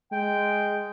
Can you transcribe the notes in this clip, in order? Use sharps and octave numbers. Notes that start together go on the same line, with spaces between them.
G#3 G5